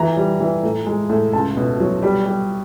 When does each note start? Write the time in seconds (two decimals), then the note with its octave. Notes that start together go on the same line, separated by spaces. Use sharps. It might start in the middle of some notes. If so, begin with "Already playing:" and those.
Already playing: E3 A#5
0.17 G3
0.40 E3
0.63 A2
0.87 G#3
1.10 A2
1.33 C#2 A5
1.57 B2
1.80 F#3
2.03 G3
2.26 G3